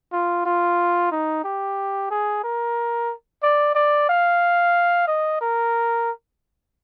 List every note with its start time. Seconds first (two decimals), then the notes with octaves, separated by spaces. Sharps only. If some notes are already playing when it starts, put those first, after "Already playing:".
0.12 F4
0.46 F4
1.11 D#4
1.44 G4
2.11 G#4
2.44 A#4
3.43 D5
3.75 D5
4.09 F5
5.07 D#5
5.41 A#4